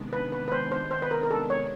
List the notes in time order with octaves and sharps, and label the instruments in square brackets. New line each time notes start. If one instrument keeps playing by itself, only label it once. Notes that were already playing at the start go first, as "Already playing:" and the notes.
Already playing: [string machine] C3 D#3 G#3 B3 D4
[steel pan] B4
B4
B4
C5
C5
C5
B4
A#4
A#4
A4
C#5